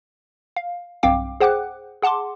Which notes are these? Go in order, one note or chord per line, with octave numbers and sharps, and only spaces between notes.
F5
B1 G2 C4 F5 G5 D6
G#4 C5 F#5 G5 D6 F#6
G#4 F#5 A5 C6 D6